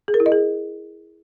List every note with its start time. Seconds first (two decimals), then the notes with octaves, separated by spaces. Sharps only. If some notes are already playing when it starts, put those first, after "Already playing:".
0.08 G#4
0.14 A#4
0.20 E4
0.26 D#5
0.32 G#4